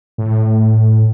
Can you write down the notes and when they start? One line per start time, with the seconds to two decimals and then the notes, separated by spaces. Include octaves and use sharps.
0.18 A2